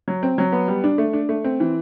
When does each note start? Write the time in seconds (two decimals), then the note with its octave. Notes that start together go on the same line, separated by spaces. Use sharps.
0.08 F#3
0.23 C4
0.38 F#3
0.52 B3
0.68 G3
0.84 D4
0.98 A3
1.13 D4
1.29 A3
1.44 C4
1.60 E3